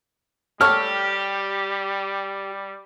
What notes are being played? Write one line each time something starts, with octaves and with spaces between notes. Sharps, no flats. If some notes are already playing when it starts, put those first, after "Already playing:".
G3 G4 A4 C#5 F6